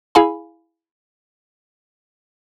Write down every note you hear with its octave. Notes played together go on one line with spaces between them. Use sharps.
E4 G#4 F5 G#5 B5